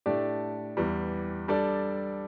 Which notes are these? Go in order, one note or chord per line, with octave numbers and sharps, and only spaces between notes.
A2 A3 D4 G4 D5
E2 E3 G3
G3 D4 A4 D5